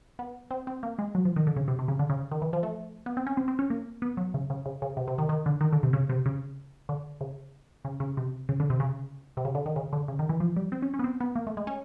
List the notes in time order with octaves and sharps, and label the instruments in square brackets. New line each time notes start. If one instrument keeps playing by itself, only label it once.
[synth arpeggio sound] B3
C4
C4
A#3
G#3
F#3
F3
D#3
D3
C#3
C3
C3
C#3
D3
C#3
D#3
E3
F3
A3
B3
C4
C#4
C4
C4
C#4
A#3
B3
F#3
C#3
C#3
C#3
C#3
C3
C3
D#3
D#3
D3
D#3
D3
C3
C#3
C3
C#3
D3
C#3
C#3
C#3
C3
C#3
D3
C3
C#3
C3
C#3
D3
D#3
C#3
D3
C#3
D#3
E3
F3
G3
C4
C#4
C#4
B3
C4
B3
A#3
A3
G#3
C#4